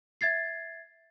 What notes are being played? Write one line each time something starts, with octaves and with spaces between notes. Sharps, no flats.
E5 G#6 A6 C7